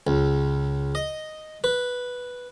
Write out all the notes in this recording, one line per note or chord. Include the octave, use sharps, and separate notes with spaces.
C#2
D#5
B4